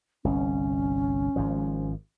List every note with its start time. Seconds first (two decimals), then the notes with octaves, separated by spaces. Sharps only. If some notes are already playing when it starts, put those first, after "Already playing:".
0.25 G1 C2 C#4
1.36 G#1 G#2 F3